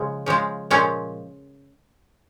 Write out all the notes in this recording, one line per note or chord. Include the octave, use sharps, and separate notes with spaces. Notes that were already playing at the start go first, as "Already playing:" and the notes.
Already playing: C#3 F3 G#3
C#3 F3 G#3
A#2 F3 G#3 C#4